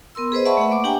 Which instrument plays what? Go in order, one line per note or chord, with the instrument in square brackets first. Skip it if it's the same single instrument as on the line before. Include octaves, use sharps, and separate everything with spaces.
[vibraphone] B3 A#4 C6 E6
G#4 B4 C5 D#5
D5 E5 F#5 A5 B5 C#6
A3 E5 F#5
A#3 D6
D4 G4 G5 G#5 A#5